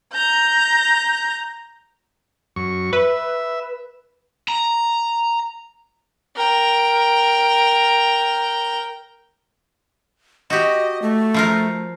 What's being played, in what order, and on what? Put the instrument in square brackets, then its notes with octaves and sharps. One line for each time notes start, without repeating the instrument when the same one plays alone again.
[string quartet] A#5 G6
[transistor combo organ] F#2 C#6
[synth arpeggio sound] B4 [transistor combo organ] E5
[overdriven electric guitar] A#5
[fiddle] A#4 G5
[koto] F#4 G4 [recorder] D#5
[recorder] A3
[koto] F3 F4 A#4